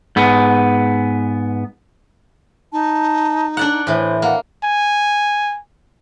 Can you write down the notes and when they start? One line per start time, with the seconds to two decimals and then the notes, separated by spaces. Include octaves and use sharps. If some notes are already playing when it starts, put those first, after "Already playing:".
0.16 G#2 B3
2.72 D#4 A5
3.57 D4 D5 F#5
3.87 A2 E3 C5
4.22 A#3 F#5
4.64 G#5